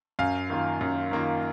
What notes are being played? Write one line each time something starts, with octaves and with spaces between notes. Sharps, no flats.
F#2 F5
D#3 A#3 F4
F#2
D#3 A#3 F4